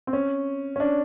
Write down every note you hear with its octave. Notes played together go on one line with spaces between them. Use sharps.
C4
C#4
C#4
D4